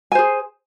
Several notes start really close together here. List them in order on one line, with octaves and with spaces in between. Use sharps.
G#5 C5 G#4